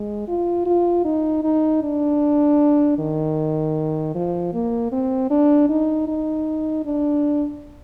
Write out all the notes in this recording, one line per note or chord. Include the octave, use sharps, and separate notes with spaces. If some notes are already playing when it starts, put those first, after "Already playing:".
Already playing: G#3
F4
F4
D#4
D#4
D4
D#3
F3
A#3
C4
D4
D#4
D#4
D4